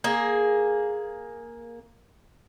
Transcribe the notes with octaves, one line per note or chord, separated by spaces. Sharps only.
A#3 G#4